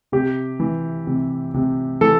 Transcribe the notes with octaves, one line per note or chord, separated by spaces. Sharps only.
C3 G4
E3
C3
C3
E3 A4